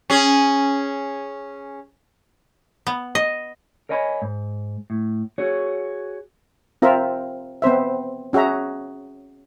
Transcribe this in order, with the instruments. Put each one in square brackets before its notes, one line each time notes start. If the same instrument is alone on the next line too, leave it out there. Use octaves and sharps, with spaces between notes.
[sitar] C#4 G#4
[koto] B3
D#5
[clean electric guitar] A#4 C#5 D#5 G#5 A#5 B5
G#2
A2
F#4 G#4 C#5
[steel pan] C4 F4 A#4 E5
B3 C4 C5 E5
C#4 F#4 G#4 E5 A#5